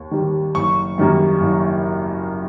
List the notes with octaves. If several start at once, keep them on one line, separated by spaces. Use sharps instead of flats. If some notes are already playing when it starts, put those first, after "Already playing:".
Already playing: D#2
D#3 G3
F#1 C#6
F#2 D#3 G3 A#3
F#1